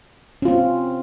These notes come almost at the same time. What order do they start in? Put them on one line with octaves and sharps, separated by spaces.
C#4 F4 C4